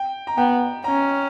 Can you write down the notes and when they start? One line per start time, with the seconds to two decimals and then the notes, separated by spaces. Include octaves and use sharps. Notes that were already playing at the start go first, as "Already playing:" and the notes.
Already playing: G5
0.27 A#5
0.38 B3 G5
0.84 C#4 A#5